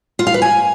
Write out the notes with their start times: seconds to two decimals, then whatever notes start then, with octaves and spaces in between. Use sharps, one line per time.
0.19 F4
0.27 F5
0.34 B4
0.42 G#5